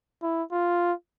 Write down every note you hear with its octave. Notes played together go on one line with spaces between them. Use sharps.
E4
F4